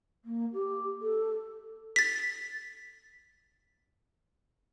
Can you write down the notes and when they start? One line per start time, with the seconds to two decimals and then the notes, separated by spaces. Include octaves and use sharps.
0.25 A#3
0.53 G4
1.02 A4
1.96 A6 B6